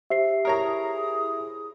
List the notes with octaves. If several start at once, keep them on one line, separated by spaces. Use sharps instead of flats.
G4 C5 E5 C7
E4 G#4 A#4 C#5 A#5 D#6